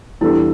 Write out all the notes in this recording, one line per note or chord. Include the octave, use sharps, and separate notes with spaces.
E2 E3 G3 D4 E4 A4